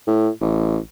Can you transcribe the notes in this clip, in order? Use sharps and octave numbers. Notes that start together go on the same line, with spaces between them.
A2
A1